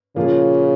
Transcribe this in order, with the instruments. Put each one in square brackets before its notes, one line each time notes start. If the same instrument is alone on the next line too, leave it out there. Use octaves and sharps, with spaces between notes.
[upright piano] A#2 F3 A#3 F4 [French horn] C#3